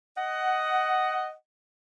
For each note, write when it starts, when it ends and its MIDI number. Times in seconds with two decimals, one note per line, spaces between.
0.17 1.32 75
0.17 1.32 78